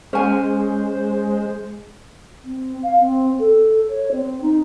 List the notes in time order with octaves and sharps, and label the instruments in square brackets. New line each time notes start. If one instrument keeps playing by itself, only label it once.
[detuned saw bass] G#3 [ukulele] C#4 G#5 [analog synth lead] C5
[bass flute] C4
F5
C4
A4
C#5
C4
D#4